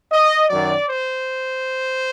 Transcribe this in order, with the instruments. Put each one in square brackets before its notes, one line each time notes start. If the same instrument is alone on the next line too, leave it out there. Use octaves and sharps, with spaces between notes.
[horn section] D#5
F#2 D#3 F#3 D5
C5